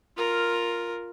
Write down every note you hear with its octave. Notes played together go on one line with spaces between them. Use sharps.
F4 A#4